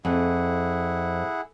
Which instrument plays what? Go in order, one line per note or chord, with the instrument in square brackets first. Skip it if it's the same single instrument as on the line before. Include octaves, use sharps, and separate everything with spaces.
[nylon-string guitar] F2 [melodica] E4 G#4 F#5